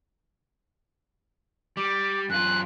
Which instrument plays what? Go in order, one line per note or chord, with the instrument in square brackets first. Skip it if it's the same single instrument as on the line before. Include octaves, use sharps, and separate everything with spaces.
[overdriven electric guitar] G3 [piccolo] D6
[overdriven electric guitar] F#2 F4 [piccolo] F#6